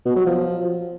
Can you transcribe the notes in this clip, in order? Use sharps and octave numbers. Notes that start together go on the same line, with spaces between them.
B2
F#3
F3